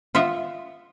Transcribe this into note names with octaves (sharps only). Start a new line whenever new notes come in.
F4 D#5 E5 F#5